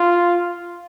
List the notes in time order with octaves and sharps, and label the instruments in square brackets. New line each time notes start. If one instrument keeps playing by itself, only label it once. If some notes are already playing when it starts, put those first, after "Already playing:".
Already playing: [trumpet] F4